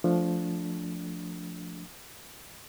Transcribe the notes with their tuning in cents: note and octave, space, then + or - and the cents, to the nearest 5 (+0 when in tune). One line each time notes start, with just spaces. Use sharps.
F3 +0 A3 +0 D4 -20